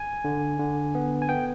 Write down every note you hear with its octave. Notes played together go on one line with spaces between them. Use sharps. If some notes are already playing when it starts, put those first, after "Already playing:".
Already playing: G#5
D3
D3
B3
G#5
B3 G5